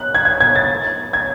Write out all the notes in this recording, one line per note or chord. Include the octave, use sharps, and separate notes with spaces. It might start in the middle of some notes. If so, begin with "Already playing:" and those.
Already playing: F#6
G#6
G#6
G#6
A6
G#6